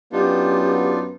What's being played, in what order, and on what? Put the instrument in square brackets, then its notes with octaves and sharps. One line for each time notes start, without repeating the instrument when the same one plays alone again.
[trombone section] F#2 B3 [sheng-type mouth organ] D4 D#4 F4 [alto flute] G4